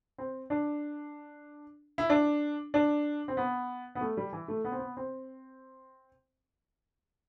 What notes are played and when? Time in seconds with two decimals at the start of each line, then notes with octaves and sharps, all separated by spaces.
0.18 C4
0.50 D4
1.98 E4
2.10 D4
2.74 D4
3.28 C4
3.37 B3
3.95 B3
4.01 A3
4.17 G3
4.33 E3
4.48 A3
4.65 B3
4.72 C4
4.78 B3
4.97 C4